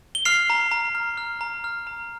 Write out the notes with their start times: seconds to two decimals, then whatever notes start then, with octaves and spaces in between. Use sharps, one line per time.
0.15 G7
0.25 F6 C7 F7
0.50 A#5
0.72 A#5
0.95 F6
1.18 F6
1.41 A#5
1.64 F6
1.87 A#5